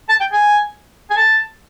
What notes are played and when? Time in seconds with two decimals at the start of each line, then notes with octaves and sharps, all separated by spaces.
0.09 A5
0.20 G5
0.32 G#5
1.10 G#5
1.17 A5